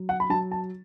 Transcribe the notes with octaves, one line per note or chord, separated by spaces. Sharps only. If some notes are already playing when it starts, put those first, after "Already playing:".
Already playing: F#3
F#5
B5
F#3 A5
A5